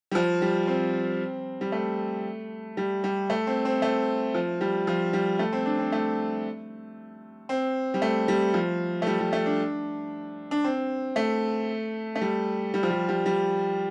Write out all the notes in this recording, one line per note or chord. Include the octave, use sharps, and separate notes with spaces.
G3
F3
G3
C4
G3
A3
G3
G3
A3
C4
C4
A3
F3
G3
F3
G3
A3
C4
D4
C4
A3
C4
G3
A3
G3
F3
A3
G3
G3
A3
D4
D4
C4
A3
A3
G3
G3
F3
G3
G3
G3